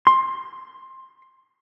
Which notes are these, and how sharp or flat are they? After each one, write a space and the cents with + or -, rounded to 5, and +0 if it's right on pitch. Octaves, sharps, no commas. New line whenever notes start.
C6 +15